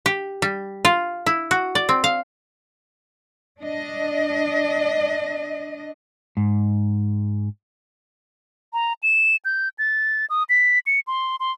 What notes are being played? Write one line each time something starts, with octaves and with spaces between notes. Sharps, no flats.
G4
G3
F4
E4
F#4
D5
C4
F5
D4 D#5
G#2
A#5
E7
G6
A6
D#6
B6
C#7
C6
C6